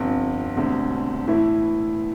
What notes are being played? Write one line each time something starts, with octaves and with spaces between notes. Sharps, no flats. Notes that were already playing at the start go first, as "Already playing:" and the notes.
Already playing: G1 F2 C3
E1 D2 C3
A2 E3 A3 E4